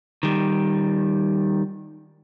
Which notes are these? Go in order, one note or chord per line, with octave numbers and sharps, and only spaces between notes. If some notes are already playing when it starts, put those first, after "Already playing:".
D#3 G3